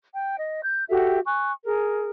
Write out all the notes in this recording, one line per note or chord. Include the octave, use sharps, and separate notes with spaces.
G5
D#5
G6
F#4 G4 A4 E5
G#5 C#6 F#6
G#4 A#4